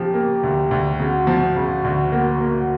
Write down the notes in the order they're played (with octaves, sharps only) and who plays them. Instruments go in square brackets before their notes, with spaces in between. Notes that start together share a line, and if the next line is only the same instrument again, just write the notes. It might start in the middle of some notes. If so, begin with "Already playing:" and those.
Already playing: [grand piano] C#3 F3 [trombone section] G4
[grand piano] A#3
D2
D2
[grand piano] C#3 [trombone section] F#4
[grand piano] F3
C#3
D2
A#3
A#3